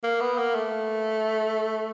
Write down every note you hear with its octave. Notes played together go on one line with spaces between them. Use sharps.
A#3
B3
A#3
A3